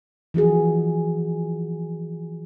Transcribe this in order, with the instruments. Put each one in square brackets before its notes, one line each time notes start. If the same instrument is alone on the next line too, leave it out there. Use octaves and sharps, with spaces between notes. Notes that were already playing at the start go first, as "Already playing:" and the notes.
[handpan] E3 F3 F#4 G#4